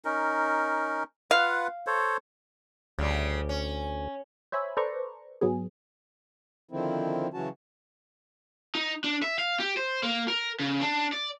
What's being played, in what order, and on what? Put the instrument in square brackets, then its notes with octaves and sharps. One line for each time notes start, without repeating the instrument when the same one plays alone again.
[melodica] C#4 D#4 A#4
[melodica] F4 B4 F#5 [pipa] F5
[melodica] A4 C5 C#5
[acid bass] D2 [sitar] C#3 G3
[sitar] C#4
[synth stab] C5 C#5 E5 G#5 B5
A4 B4 C5 D5 A#5 C#6
G#2 F#3 B3 G#4
[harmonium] D3 D#3 F3 C4 E4
C#3 E3 F#3 C#4 F#4 A5
[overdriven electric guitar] D#4
D4
E5
F5
G4
C5
A#3
A#4
C#3
D4
D5